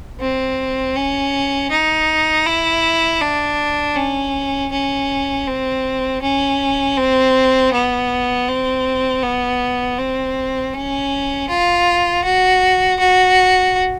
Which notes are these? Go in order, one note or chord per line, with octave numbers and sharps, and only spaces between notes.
C4
C#4
D#4
E4
D4
C#4
C#4
C4
C#4
C4
B3
C4
B3
C4
C#4
F4
F#4
F#4